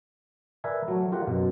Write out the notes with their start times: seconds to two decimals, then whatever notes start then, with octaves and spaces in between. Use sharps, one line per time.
0.64 A#4 B4 D5 E5 G#5
0.88 F#3 A3
1.12 F4 G4 A#4 F#5
1.27 F#2 B2